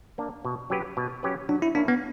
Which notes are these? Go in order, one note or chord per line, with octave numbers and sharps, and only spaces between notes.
A#3 D4
B2
F#3 C#4 G4 B4
B2
F#3 C#4 G4 B4
F#3 D4
E4
A#3 C#4 D4 E4
B3